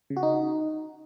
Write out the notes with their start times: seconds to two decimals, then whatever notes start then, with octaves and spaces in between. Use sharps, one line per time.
0.10 C#3
0.17 F#4
0.23 D#4